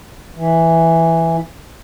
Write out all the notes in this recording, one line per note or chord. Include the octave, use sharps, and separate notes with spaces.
E3